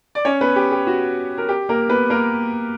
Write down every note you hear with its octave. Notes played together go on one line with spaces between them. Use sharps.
D5
C#4 C#5
B3 B4
G4
G4
F#4
A#4
G4
A#3 A#4
B3 B4
A#3 A#4